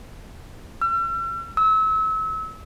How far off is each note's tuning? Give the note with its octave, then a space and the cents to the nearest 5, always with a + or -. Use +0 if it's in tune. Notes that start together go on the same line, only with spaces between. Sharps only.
E6 +45
E6 -30